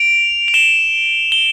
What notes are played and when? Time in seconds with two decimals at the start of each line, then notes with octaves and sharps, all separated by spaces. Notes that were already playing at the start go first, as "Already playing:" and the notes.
Already playing: D7 F7
0.48 F7
0.54 E7 G7
1.32 G7